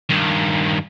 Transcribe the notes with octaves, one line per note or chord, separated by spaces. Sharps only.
G2 D#3